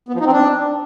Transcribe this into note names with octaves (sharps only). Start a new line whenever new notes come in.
B3
F3
D#4
C4
D4